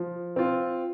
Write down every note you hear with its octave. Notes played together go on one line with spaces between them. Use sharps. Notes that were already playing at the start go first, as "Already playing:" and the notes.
Already playing: F3
C4 F4